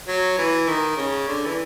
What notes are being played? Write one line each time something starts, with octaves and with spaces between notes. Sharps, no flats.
F#3
E3
D#3
C#3
D3
E3